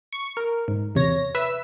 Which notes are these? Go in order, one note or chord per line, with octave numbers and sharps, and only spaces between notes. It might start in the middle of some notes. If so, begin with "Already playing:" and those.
C#6
A#4
G#2
E2 C3 C#5 A#6
B4 E5 E6